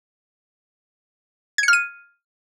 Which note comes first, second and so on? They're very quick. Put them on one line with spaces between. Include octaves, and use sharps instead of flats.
G#6 C#7 F6 D#7